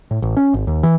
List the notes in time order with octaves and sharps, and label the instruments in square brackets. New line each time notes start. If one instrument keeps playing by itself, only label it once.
[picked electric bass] A2
A1
C#4
G#1
D#2
E3